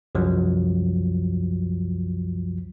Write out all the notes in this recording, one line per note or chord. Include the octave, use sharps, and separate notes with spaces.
C2 F#2 F3 F#3